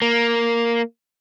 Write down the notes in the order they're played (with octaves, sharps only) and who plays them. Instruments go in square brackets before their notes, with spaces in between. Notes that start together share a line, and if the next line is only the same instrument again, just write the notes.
[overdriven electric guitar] A#3